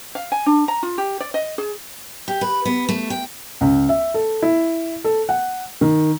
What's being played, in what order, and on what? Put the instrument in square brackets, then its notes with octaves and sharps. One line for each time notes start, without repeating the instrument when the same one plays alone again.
[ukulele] F5
G#5
D4
A#5
F4
G4
D5
D#5
G#4
[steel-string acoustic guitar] G4
B4
B3
A3
G5
[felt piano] C#2
E5
A4
E4
A4
F#5
D#3